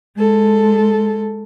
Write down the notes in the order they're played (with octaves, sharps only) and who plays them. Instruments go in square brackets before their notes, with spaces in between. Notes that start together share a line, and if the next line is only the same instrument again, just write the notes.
[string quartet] G#3 A4